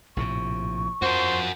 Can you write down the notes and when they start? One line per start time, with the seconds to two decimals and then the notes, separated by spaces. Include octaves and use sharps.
0.17 A#1 A2 C3 C#6
1.02 F2 F#4 A#4 C5